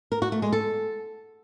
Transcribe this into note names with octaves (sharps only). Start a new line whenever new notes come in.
A#4
F#4
A3
G#3
A4